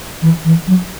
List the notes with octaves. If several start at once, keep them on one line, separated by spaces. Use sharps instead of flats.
E3
E3
F#3